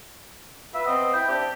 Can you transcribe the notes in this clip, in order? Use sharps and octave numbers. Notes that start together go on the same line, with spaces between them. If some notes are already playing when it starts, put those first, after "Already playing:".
F4 B4 E5
B3 C4 D#5
E4 G5
C4 D4 G4